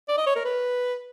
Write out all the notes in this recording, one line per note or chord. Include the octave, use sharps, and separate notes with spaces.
D5
D#5
C#5
A#4
B4